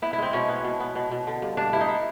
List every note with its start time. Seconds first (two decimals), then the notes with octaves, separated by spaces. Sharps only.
0.02 B3 E4
0.13 E4
0.18 G#3 C4
0.33 B2 C#4
0.48 B3
0.64 B2
0.80 B3
0.95 B2
1.11 B2
1.27 D3
1.42 G2
1.57 G2 D4
1.73 G2 E4
1.81 D#4
1.89 E4